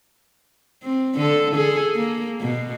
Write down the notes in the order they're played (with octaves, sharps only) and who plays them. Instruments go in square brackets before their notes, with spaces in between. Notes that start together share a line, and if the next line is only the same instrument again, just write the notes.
[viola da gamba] C4
D3 A4
G#4 A4
A#3
B2